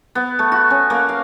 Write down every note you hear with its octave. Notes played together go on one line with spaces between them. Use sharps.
B3
A3
F#4
C#4
A#3
F5